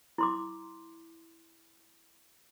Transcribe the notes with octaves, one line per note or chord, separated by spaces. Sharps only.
E4 C6 D6